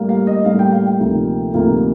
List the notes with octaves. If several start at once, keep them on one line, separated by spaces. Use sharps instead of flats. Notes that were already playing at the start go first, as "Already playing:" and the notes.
Already playing: A2 G3 A#3
F5
D#5
A2 G3 A#3 F5
G5
F5
G5
D2 C3 F3 A#3 D#4
D2 C3 F3 A#3 D#4